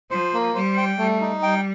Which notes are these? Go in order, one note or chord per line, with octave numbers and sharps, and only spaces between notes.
F3 C5
A#3
G3 C5
G5
G3 A3
D#4
G3 G5